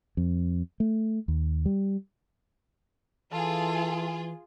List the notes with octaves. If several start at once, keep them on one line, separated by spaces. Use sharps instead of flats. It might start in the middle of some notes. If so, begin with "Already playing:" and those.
F2
A3
D#2
G3
E3 F4 G#4 A4